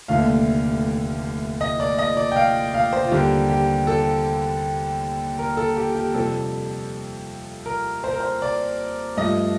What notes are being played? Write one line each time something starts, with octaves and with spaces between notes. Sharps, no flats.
F1 D#2 D3 A3 F5
D#5
D5
D#5
D5
G5
F5
F5
C5
F4
D#2 D3 G3 A#3 G4
G4
A4
A#4
A4
G4
G4
F2 C3 G3 A4
A#4
C5
A#4
C5
D5
G2 F3 A3 D#5